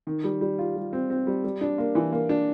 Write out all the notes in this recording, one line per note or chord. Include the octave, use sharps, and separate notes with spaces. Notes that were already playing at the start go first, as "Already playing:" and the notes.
D#3
G3
G3
F4
G3
C4
C4
G3
G3
D4
A#3
E3
A#3
D4